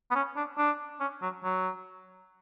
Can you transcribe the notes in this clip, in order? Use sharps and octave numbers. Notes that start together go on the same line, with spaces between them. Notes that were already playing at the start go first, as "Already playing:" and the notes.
B3
C#4
D4
D4
C#4
F#3
F#3